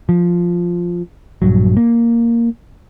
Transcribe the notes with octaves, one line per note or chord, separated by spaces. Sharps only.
F3
A#1 E2 G2 F#3
A#3